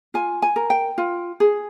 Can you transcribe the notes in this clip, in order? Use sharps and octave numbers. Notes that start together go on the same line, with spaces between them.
F4 G#5
G#5
A#4
G5
F4
G#4